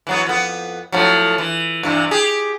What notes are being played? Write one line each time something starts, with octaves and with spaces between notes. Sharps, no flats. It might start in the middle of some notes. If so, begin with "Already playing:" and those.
E3 F#3 B3
F2 B3
A2 F3 F#3
E3
G2 C3 E3
G4 G#4